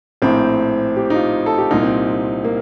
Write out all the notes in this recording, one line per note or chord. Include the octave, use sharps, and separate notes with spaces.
A#1 A2 C4
G4
D#4
F4
A4
G4
C2 A#2 D#4
C4
A#3